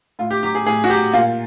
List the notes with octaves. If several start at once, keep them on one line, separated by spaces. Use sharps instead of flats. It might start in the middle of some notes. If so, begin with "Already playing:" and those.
A2 F4
G4
F#3 G4
G#4
A2 G#4
F#4
F#3 G4
A#2 F4